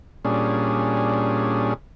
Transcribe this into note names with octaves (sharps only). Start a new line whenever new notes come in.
A#2 G3 C#4 D4 G#4